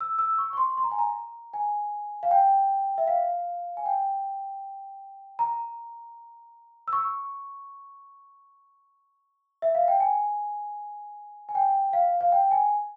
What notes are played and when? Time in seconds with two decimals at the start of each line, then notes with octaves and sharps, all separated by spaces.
0.01 E6
0.19 E6
0.38 C#6
0.53 C#6
0.57 C6
0.78 C6
0.84 A#5
0.91 G#5
0.99 A#5
1.54 G#5
2.23 F5
2.31 G5
2.98 E5
3.07 F5
3.77 G#5
3.86 G5
5.39 A#5
6.88 E6
6.93 C#6
9.62 E5
9.75 F5
9.88 G5
10.00 G#5
11.49 G#5
11.55 G5
11.93 F5
12.21 F5
12.32 G5
12.51 G#5